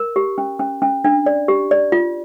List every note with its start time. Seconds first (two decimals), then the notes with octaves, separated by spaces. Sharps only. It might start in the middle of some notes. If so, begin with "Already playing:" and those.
Already playing: A#4
0.16 G4
0.38 C#4
0.59 C#4
0.82 C#4
1.04 D4
1.26 D5
1.48 G4
1.71 D5
1.92 F4